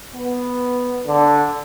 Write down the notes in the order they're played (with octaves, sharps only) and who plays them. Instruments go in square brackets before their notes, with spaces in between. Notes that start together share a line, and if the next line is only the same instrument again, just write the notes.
[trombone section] B3
D3